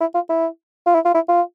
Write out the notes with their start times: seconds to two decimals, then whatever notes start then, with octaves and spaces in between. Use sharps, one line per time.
0.01 E4
0.14 F4
0.29 E4
0.86 F4
0.94 E4
1.05 F4
1.14 E4
1.28 F4